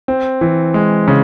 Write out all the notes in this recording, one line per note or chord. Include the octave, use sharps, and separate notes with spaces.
C4
E3
G#3
C#3